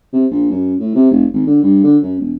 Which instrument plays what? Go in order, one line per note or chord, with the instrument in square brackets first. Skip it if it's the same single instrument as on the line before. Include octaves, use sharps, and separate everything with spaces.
[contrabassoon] C3
A#1
F#2
A2
C3
F1
G#1
D3
G2
D3
F#2
E1